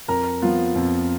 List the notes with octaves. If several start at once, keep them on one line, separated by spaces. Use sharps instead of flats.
F2 A#4 A#5
F3 B3 F4
F2